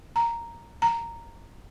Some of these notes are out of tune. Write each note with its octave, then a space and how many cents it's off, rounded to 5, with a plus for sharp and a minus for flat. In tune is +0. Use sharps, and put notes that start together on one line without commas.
A#5 -5
A#5 -10